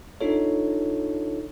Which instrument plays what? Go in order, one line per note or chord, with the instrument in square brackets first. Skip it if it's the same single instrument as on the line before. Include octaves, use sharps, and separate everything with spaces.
[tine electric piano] D4 D#4 F4 A4 C#5